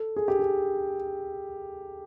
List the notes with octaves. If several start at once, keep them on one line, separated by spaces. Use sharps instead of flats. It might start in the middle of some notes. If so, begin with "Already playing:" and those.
Already playing: A4
G#4
G4
G#4